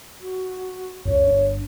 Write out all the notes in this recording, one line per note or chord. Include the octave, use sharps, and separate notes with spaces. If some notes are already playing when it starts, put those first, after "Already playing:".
F#4
C#2 F#2 C#5
G1 D4